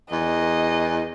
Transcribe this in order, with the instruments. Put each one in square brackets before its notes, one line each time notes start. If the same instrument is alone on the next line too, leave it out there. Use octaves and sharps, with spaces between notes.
[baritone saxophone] E2 [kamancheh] D#5